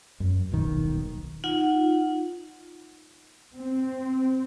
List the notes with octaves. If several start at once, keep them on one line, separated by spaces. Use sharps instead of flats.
F#2
D#1 B1 D#3
D#4 F4 F#5
C4